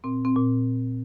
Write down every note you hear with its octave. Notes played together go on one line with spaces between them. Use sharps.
A#2 C4
C4
A#2